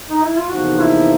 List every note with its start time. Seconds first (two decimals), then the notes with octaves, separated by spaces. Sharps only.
0.10 D#4
0.22 E4
0.36 F4
0.50 E2 C3 F3 A#3 D#4 F#4
0.80 E4